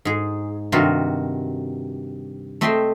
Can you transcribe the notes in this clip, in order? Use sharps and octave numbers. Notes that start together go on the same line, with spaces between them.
G#2 G#4
G2 C3 D#3 F4 F#4
A3 C4 D#5 E5 G5 C6